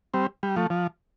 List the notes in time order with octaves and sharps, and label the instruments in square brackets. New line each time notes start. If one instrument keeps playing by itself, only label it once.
[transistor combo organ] G3 C4
G3
F3 A3
F3